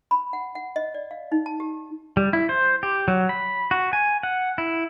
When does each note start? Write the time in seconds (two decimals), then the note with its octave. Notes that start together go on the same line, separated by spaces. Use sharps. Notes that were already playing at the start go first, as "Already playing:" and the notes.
0.11 B5
0.33 F#5
0.55 F#5
0.76 D#5
0.94 D5
1.11 F5
1.32 D#4
1.46 A5
1.60 G4
2.17 G3
2.33 E4
2.49 C5
2.83 G4
3.08 F#3
3.29 B5
3.71 F#4
3.93 G#5
4.23 F#5
4.58 E4